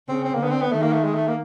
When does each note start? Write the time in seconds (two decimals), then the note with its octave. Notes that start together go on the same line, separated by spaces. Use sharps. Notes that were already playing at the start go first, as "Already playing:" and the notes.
0.09 C#3 C4
0.24 C4
0.35 A#3
0.40 D3 B3
0.51 C4
0.61 B3
0.72 D#3 A3
0.83 A#3
0.93 A3
1.04 G#3
1.15 A3
1.28 A#3